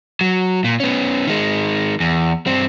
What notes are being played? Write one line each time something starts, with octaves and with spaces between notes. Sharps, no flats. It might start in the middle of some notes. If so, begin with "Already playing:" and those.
F#3
A#2
B3 C#4
D#3 G#3
E2
G2 C4